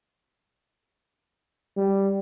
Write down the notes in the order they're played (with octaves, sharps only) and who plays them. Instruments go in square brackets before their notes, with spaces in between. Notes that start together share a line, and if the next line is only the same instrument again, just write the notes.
[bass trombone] G3